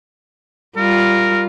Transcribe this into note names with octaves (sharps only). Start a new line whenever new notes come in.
G3 F4 A#4